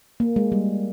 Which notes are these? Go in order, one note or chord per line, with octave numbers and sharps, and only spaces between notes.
A#3
G#3
G3